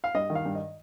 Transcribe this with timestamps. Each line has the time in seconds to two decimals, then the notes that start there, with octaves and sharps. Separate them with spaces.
0.04 F5
0.15 G2 D#5
0.30 D#3
0.35 F5
0.45 G2
0.55 D#5